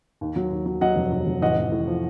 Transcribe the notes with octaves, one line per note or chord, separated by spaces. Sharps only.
D#2
F#3
D#2
F#3
F#3 D#5 F#5
F1
F#3
F1
A1 D#5 F#5
A1
A2
F3